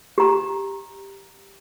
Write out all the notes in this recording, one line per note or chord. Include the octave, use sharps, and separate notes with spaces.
G4 A#5